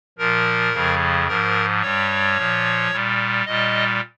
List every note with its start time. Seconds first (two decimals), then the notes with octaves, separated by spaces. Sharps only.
0.18 A#2 F3 A#4
0.73 F2 C#3 F3
1.27 G#2 F3 A#4
1.82 G2 G3 C#5
2.37 A#2 F3
2.91 A#2 G3
3.46 A#2 G3 D#5